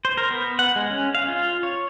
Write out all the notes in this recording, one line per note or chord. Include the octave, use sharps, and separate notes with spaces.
C5
A#4
B3
F#5
G#3
C#4
F5
F4
C#5